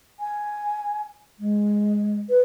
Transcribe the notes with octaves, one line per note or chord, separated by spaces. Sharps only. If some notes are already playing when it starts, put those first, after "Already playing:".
G#5
G#3
B4